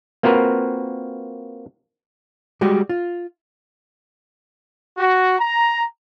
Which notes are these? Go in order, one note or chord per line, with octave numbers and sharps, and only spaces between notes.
A#3 C4 F4 F#4 A#4 B4
G3 G#3 F#4 G4
F4
F#4
A#5